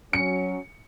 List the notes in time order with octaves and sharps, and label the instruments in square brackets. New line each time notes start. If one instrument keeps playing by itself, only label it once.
[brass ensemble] F#3 C#4 [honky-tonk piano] C#7